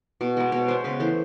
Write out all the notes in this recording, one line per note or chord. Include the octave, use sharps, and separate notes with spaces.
B2
G#3 B3
B2 C#5
G#3 B3 C5
C#3 B4
E3 A3 C5